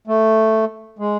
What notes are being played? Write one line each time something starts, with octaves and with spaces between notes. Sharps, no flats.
A3
G#3